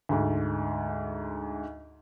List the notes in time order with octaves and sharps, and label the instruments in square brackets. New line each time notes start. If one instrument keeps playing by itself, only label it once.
[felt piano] D2 G#2